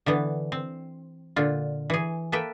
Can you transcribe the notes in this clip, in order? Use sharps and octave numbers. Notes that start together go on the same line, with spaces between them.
D3 E3 B3
C4
A#2 D3 F4
E3 G#4
A#3 A4 B4 E5 G5